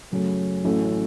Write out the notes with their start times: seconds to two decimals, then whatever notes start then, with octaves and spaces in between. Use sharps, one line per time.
0.11 F#2 C#3 F#3 A3 C#4
0.65 A1 A2 F#3 A3 C#4